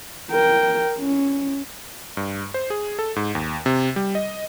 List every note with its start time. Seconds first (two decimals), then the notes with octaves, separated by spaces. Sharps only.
0.31 A#4 G5
0.99 C#4
2.17 G2
2.54 C5
2.70 G#4
2.99 A4
3.16 G#2
3.35 D#2
3.66 C3
3.96 G3
4.15 D#5